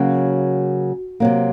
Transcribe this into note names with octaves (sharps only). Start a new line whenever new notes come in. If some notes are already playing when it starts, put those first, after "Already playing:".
Already playing: C#3 F#3 A#3 F#4
C3 F#3 A#3